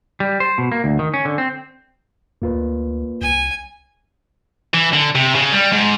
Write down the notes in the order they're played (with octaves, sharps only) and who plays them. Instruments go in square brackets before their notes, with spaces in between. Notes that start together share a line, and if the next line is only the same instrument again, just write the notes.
[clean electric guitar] G3
C5
B2
A#3
D2
D#3
C#4
D3
C4
[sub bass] D2 [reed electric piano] A#3 F4 B4
[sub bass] C2 [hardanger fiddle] G#5
[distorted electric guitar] E3
D3
C3
C#3
G3
G#2